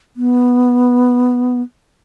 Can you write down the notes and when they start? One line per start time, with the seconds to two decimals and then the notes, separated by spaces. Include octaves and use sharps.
0.17 B3